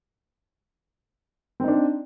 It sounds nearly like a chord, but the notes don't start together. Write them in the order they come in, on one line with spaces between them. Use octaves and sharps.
C4 D#4 D4